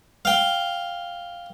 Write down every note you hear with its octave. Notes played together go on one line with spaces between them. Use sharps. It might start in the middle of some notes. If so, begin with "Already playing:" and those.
F5 G5